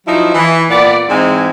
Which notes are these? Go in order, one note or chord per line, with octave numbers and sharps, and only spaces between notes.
F3 F#3 D#4 E4
E3
A#2 B3 D5
G#2 E3 G#3 C4